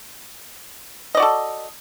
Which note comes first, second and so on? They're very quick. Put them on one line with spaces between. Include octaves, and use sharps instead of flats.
D#5 D5 F#4 A4